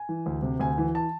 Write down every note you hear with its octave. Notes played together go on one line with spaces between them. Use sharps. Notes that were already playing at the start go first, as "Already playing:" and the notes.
Already playing: G#5
E3
D2
C3
D2 G#5
E3
A5